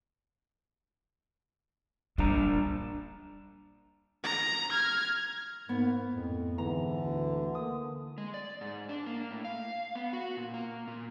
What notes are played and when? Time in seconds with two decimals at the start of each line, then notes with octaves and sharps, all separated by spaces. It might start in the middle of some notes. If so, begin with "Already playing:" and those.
2.18 A#2 G3 D4 A#5
4.24 A#5
4.70 F6 G#6
5.69 G#2 A#3 B3
6.10 F2 A2
6.58 G#2 D3 E3 A#5
7.04 D2
7.55 A#3 D#6
8.18 G#3
8.34 D5
8.61 G#2
8.89 D4
9.06 A#3
9.31 A2
9.45 F5
9.95 B3
10.13 F#4
10.37 A#2
10.54 A#3
10.87 A#2